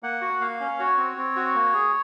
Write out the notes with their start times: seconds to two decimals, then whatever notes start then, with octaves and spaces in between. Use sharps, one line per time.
0.03 A#3 F#5
0.21 F#4
0.41 A#3 F5
0.60 C#4
0.79 F#4 C#5
0.97 C4
1.18 C4
1.36 F#4
1.55 A#3
1.74 G#4